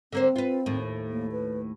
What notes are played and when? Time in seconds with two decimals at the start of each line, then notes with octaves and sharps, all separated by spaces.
0.13 D3 A#3 C4 C5
0.36 F4 B4
0.66 D#2 A2
1.08 A#3
1.32 B4